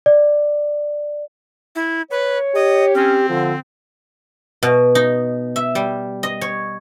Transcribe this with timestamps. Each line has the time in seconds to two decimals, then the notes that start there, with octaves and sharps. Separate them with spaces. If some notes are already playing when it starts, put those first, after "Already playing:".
0.06 D5
1.75 E4
2.11 B4 C#5
2.55 G4 D#5
2.95 C4 C#4
3.29 D3 F3
4.63 B2
4.95 D#4
5.56 E5
5.75 G3
6.23 D#5
6.41 C#5